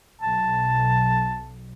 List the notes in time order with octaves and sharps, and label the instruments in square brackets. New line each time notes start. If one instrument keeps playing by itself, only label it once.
[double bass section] B1 [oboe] A5